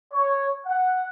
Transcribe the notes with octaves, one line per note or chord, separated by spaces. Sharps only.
C#5
F#5